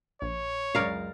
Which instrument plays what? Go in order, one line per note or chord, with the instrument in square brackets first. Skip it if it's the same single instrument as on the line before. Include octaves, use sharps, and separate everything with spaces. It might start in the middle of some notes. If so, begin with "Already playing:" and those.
[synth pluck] A#1 [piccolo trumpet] C#5
[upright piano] C#2 F#2 A6 [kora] A#4 F5 [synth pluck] D5 A#5 D#6